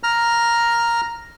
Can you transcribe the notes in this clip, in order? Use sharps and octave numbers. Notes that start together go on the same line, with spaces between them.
A#5 F6